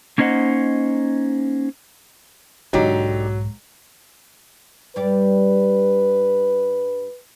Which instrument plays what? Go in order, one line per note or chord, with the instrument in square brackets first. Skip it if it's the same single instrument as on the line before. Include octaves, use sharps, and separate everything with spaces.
[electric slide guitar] A#3 C#4 D#4 C5 D#5 F#5
[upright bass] B1 G#2 [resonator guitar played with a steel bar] D3 D#4 G4 [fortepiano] F#3
[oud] G2 G3 D5 [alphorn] B4